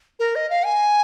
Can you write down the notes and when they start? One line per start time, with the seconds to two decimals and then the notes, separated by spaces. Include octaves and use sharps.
0.19 A#4
0.35 D#5
0.50 F5
0.65 G#5